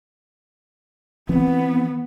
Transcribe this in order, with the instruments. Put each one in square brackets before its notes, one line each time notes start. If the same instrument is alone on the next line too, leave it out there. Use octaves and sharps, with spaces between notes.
[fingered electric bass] E3 C4 [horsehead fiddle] B3